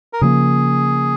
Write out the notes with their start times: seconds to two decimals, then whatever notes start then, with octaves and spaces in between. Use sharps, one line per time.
0.13 A#4
0.21 C#3 F3 A#3 G#4